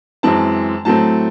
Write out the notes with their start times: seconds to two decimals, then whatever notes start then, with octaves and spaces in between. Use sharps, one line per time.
0.23 F#2 E3 G#3 C4 A5
0.85 A2 F#3 A3 C4 A5